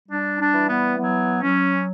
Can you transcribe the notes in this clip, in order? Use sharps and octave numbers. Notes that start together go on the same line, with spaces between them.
G3 D4
D4
E3
B3
F#3 B3
F#3 C#4